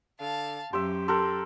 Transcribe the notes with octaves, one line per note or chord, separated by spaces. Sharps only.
D3 F5 A5
F#2 G4 E5 C6
G4 A4 A#4 C6